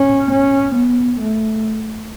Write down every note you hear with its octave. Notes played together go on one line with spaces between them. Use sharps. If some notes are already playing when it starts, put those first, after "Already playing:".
Already playing: C#4
C#4
B3
A3